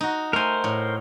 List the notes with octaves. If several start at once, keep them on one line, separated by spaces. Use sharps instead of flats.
D#4 F#4
A3 A#4 C5 G#5
A2